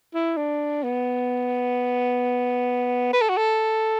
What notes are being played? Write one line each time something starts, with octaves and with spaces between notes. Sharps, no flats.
E4
D4
B3
B4
A4
F#4
A4